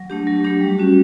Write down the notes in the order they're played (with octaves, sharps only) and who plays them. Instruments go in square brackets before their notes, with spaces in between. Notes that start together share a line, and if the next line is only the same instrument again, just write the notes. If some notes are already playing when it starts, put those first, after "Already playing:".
Already playing: [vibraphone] F#3
A3 D4 G4
F#3
A3 D4 G4
G3
C#4 F#4